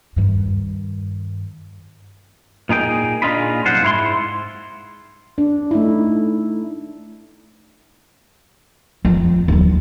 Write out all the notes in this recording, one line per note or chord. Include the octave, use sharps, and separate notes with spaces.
G2 D#3
A#2 D#4 G#4 G5
A#2 D4 D#4 F4 G#4 B5
C2 F#2 F4 C5 F#5
G#2 E4 C#5 C6
D4
A3 D#4 E4
F2
D#2 F#3